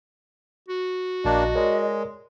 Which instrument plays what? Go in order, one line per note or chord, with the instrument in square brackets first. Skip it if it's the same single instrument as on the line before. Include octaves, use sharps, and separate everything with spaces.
[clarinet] F#4
[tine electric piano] A#1 A5 F#6 [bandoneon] A#3 D4 [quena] D#5
[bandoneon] G#3 [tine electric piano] A#4 C#5 D5